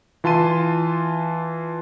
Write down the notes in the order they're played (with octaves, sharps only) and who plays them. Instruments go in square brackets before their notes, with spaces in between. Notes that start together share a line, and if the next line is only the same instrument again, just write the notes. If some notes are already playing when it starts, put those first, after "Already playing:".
[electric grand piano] E3 F4 A5 C6 D#7